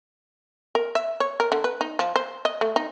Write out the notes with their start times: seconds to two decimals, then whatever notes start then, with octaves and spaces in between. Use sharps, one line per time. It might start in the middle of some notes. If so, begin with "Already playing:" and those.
0.75 A#4
0.95 E5
1.20 C#5
1.40 A#4
1.52 D3
1.64 B4
1.81 D#4
1.99 F3
2.16 C5
2.45 D#5
2.61 A3
2.76 D#4